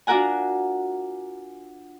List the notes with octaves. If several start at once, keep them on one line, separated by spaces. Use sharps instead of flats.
D4 F4 F#4 A#4 F#5 G#5